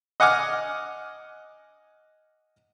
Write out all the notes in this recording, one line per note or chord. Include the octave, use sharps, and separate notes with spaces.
D#5 F#5 G#5 D6 F6